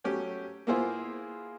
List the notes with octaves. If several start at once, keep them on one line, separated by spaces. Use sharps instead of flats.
F#3 A3 C#4 G4
A#3 B3 E4 F4 G#4 C5